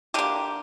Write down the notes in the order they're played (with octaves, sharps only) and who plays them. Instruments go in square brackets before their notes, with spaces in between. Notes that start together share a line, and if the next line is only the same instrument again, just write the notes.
[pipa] D3 A#3 G4